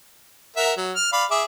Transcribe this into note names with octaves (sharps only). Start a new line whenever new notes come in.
A#4 E5 F#5
F#3
F6
D5 F5 B5
G#4 E5 D6